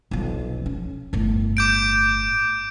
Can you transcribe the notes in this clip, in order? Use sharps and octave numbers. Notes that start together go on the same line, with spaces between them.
B1 F3
C#4
G1 A2
D6 G6 D7